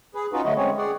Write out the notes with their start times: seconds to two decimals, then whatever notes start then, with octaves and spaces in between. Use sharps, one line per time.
0.15 G#4 B4
0.33 C#4 D#4 F4 F#4 B4
0.45 D3 F#3 A3 F#4 D#5
0.56 G#3 C4 C#4 C#5
0.77 G#4 D5 F#5